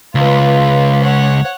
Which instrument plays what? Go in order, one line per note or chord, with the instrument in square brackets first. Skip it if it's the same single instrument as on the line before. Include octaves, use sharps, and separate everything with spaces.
[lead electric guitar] C#2 [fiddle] F4 B4
[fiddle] C#5 F#5